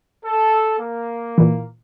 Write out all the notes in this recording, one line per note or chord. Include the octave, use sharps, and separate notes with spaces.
A4
A#3
A#2 E3